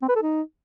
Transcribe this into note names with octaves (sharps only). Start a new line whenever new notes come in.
C4
B4
A4
D#4